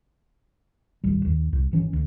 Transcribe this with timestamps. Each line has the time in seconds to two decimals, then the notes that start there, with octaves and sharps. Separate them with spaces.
1.04 D1 G#1 G3
1.25 D#2
1.53 C2
1.71 G1 E3 C#4
1.93 D2